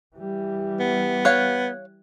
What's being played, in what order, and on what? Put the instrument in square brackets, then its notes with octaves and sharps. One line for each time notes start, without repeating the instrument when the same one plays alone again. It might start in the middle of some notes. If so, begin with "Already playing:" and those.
[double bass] E3 G3
[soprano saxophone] B3
[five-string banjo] C#5 F5 [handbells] F#6 G#6